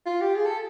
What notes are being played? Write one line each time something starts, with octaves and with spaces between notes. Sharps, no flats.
F4
G4
G#4
A4